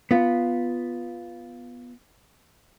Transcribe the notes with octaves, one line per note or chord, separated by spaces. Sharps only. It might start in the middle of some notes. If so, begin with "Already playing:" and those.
B3 F4